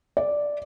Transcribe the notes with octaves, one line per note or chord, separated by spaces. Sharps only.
D5